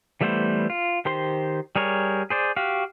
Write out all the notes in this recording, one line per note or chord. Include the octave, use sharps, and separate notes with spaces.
E3 G3 A3 B3 C5
F4
D#3 G4 C5 C6
G3 G#4 A#4 C#5
G#4 C5 D5
F#4 G4 F5